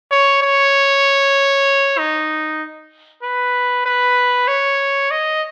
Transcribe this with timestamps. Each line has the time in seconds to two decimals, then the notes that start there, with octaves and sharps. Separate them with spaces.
0.11 C#5
0.42 C#5
1.98 D#4
3.22 B4
3.86 B4
4.47 C#5
5.11 D#5